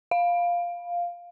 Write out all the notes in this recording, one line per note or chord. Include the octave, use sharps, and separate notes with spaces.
F5